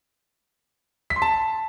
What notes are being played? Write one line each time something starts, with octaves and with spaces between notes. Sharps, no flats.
B6
C6
A5